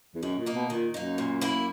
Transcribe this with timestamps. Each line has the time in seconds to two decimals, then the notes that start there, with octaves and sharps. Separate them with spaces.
0.15 E2
0.23 F#2 D#3
0.38 A#2
0.46 A#3 D#4
0.54 B2
0.70 A#2 D#3
0.94 F#2 A#3 D#4
1.18 A#2
1.41 A#3 E4